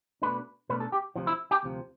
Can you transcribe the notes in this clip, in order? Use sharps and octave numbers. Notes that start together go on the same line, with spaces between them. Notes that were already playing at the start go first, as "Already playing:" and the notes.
B2 A3 D4 B4
B2 A3 D4 B4
A4
G4
D2 C3 F3
E4
G4
D2 C3 F3